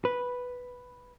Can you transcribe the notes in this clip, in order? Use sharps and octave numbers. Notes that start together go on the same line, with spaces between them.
B4